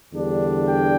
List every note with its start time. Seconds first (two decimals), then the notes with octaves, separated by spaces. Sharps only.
0.12 E2 D3 G3 D4
0.67 G5